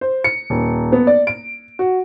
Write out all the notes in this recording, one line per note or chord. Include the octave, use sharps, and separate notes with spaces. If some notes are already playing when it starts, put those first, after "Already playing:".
C5
C#7
D#1
B3
D5
D7
F#4